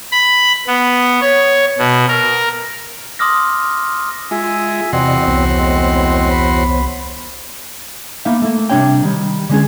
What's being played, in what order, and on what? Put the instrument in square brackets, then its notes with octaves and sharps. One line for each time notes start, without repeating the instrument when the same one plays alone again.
[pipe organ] B5
B3
C#5
B2
A#4
[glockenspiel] C6 D6 D#6 F6 A#6
[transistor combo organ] G#3 [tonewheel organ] F4 [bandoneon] E5 G#5
[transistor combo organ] E2 F#4 C6 [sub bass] C3 [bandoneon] C4 [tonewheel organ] D5 D#5
[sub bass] C2 [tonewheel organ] B3 C5 C#5
[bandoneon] A2 G#3 C4
B5
[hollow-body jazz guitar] A#3 B3 D#4 E5 F5
A3 A#3
C3 G3 D4 C#5 G5
D#3 G3
D3 G#3 C#4 G#4